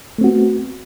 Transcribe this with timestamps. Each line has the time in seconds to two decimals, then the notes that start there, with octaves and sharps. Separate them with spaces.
0.18 A3
0.21 C4
0.24 F#4
0.27 B3